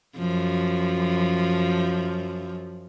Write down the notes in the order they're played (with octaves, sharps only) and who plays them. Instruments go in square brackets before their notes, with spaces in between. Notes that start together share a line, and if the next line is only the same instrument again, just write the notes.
[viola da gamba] F#2 F3